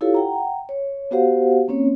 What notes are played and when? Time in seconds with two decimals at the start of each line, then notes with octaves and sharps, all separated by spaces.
0.01 E4 F4 G4 A4 C#5 F5
0.14 F#5 G5 A#5
0.69 C#5
1.11 B3 F#4 G4 C5 F5 F#5
1.68 A#3 C4 C#4 C#5